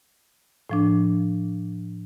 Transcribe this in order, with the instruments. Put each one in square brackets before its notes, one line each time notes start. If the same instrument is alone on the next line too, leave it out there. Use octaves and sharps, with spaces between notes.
[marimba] A2 F3 D4